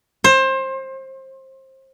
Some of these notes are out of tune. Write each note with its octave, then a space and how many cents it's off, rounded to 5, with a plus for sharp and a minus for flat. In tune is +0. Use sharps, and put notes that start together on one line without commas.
C5 +25